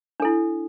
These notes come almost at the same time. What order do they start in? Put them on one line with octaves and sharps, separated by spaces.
D4 A4 E4